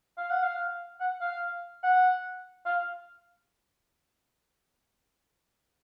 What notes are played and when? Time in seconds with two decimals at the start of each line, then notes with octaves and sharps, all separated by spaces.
0.18 F5
0.30 F#5
0.43 F5
1.00 F#5
1.21 F5
1.83 F#5
2.66 F5